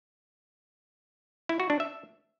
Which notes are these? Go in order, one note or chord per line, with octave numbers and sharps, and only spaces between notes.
E4
F#4
D4
E5